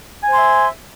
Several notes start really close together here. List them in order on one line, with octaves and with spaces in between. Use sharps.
G#5 C5 C6 E5